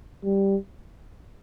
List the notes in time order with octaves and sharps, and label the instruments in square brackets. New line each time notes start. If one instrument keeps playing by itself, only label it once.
[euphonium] G3